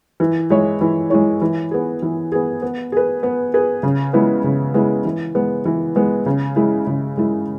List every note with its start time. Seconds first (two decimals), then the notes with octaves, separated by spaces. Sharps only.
0.20 E3
0.50 G#3 E4 C#5
0.81 E3
1.10 G#3 E4 C#5
1.42 E3
1.71 B3 G#4
2.02 E3
2.32 B3 G#4
2.62 B3
2.92 G#4 B4
3.23 B3
3.54 G#4 B4
3.83 C#3
4.13 G#3 B3 E4
4.44 C#3
4.74 G#3 B3 E4
5.05 E3
5.35 G#3 B3
5.65 E3
5.96 G#3 B3
6.26 C#3
6.56 G#3 E4
6.87 C#3
7.17 G#3 E4